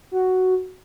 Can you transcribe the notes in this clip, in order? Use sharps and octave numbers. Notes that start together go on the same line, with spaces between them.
F#4